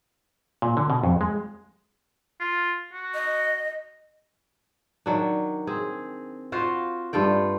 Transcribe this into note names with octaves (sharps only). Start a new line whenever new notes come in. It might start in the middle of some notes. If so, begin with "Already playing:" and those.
A#2
D3
B2
F2
G#3
F4
F#4
D#5
D#3 F#3 D4
C4 G#4
F4 F#4 C5 F5
G2 A3 F4 G5